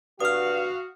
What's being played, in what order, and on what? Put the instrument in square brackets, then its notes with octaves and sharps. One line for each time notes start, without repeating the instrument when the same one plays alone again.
[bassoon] G2 [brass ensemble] F#4 [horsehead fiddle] F5 [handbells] D#6 F6